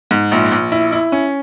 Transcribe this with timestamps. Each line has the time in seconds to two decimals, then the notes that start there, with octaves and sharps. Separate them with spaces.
0.11 G#2
0.32 A#1
0.52 A#1
0.72 E4
0.92 E4
1.12 C#4